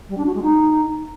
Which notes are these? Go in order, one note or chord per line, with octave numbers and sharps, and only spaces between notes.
G3
D4
F#4
G#3
D#4